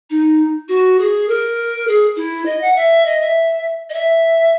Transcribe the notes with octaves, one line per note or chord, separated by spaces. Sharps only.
D#4
F#4
G#4
A#4
G#4
E4
D#5
F#5
E5
D#5
E5
D#5
E5